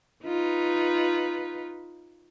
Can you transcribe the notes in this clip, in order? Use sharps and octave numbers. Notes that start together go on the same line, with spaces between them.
D#4 F4 B4